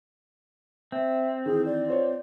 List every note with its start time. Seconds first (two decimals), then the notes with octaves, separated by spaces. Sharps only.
0.92 C4 E5
1.46 D#3 E3 G#4
1.66 D5
1.88 F4 C5 C#5